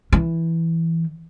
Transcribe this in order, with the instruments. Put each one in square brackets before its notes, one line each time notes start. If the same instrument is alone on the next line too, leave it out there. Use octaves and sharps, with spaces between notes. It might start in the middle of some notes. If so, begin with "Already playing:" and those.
[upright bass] E3